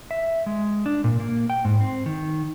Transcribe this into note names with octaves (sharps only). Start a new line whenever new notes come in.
E5
G#3
D4
A#2
A#3
G5
G#2
C4
D#3